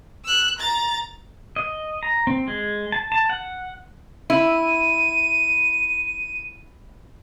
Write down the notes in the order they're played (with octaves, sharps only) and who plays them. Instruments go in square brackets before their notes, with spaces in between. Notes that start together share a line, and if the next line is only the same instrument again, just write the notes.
[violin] E6 F#6
A#5 A6
[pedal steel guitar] D#5
A#5
C4
G#3
A5
A5
F#5
[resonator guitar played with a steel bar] E4 [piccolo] D#7